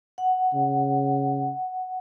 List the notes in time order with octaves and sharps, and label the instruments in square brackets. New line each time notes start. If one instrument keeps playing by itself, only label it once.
[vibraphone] F#5
[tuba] C#3